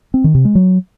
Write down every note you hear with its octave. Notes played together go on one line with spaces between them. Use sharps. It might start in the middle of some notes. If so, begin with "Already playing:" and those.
C4
D#3
C3
G#3
F#3